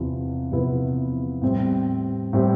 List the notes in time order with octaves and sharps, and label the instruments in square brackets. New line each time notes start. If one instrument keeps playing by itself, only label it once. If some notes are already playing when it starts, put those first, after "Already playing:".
Already playing: [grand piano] E2 C3 F3 B3 E4
E2 C3 F3 B3 E4
A2 G3 C4 G4
A2 G3 C4 G4